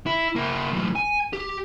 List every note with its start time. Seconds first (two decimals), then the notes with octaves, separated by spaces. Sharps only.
0.06 E4
0.36 A#3 E4
0.73 F#2 A2
0.96 G#5
1.33 G4